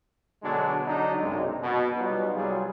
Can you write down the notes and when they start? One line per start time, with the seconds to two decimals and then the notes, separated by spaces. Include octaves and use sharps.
0.43 B2 D3 F#3 G#3 D4
0.87 D3 F#3 D4 D#4
1.22 B1 F#2 C3 G#3
1.63 B2
1.97 F#3 G3 B3 D#4 F4
2.36 C2 F#3 G3 F4 G#4